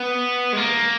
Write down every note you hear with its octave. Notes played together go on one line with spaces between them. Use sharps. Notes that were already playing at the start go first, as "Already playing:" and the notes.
Already playing: B3
G#3
A#3